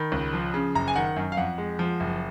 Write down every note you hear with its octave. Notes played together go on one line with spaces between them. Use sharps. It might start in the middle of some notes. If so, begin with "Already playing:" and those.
Already playing: D#3 B5
C#2
F3
C#3
F#1 A#5
G#5
D#3 F#5
F#2
F5
F2 F#5
G#3
F3
F#1